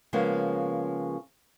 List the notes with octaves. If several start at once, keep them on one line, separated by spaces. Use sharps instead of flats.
C#3 F3 G#3 A#3 B3 C#4